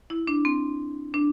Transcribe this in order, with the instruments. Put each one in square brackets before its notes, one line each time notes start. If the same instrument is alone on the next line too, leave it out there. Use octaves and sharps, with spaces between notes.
[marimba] E4
D4
C4
D4